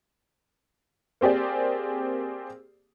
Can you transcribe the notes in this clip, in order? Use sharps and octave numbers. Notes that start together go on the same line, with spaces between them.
A#3 C4 G4 G#4 D5